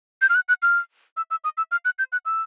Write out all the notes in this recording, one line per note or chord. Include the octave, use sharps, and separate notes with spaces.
G6
F6
F#6
F#6
F6
E6
E6
D#6
E6
F6
F#6
G6
F#6
E6